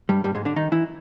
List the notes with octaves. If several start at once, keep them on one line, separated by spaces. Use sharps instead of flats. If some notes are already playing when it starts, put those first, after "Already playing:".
G2 G3
G2 G3
G#2 G#3
D3 D4
D#3 D#4
E3 E4